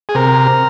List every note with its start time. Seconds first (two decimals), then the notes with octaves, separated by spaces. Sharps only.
0.09 G#4
0.15 C3 A#4